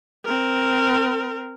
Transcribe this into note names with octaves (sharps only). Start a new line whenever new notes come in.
C4 A#4